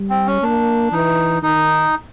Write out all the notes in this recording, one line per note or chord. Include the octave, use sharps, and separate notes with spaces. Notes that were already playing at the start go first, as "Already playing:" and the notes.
Already playing: G3
C4
C#4
A#3 D4
E3 D#4
D#3 D#4